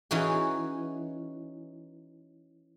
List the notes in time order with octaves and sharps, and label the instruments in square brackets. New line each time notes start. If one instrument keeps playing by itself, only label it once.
[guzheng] E3 C#4 D#4 F#4 G#4